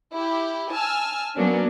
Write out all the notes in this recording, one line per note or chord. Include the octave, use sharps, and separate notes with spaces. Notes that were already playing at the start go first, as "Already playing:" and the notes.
E4 G4
G#5 A5 E6 F6
F#3 A#3 B3 C#4 D4